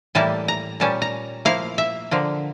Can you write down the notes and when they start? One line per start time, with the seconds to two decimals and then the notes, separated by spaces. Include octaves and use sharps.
0.15 A2 E3 G3 A#3 E4 A5
0.48 A#5
0.80 A#2 G3 C#4 A5
1.02 A#5
1.45 F3 A#3 E4 F5
1.78 E5
2.11 D3 F3 A#3